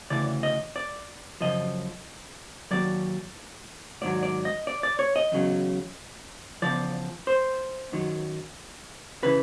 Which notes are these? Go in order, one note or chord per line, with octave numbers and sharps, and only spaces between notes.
D2 C#3 E3 D5
D#5
D5
F#2 C#3 F3 D#5
D#2 D#3 F#3 D5
G#2 D#3 F#3 D5
D5
D#5
D5
D5
C#5
D#5
E2 C#3 F#3
E2 C#3 F3 D5
C5
F#2 D#3 F#3
C#3 E3 B4